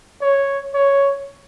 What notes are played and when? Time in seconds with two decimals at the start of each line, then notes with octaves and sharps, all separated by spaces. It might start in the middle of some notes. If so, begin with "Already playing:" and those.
0.22 C#5
0.74 C#5